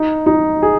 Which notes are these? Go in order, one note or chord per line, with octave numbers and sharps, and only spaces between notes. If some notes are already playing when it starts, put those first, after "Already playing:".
Already playing: D#4
D#4
G#4